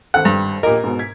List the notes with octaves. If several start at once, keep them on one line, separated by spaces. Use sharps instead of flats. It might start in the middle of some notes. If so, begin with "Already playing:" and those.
G#1 A4 F#5
G2
A#2 G4 A#4 D#5
G#2 B2
G#6 B6